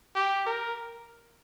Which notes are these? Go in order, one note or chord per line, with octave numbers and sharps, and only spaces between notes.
G4
A#4